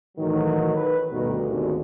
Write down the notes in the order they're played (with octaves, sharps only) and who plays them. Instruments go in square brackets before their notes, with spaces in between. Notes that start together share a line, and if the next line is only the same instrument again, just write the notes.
[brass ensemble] A2 E3 F#3 [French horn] D#3
[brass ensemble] B4
[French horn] D2 [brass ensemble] G2 B2 D#3
[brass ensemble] G#1 D#2